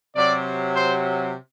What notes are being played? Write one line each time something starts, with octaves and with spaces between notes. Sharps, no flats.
C3 F#3 D5
C5